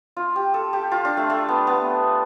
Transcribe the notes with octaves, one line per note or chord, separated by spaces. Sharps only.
F4
G4
A4
G4
F4
D4
A3
A3
B3
B3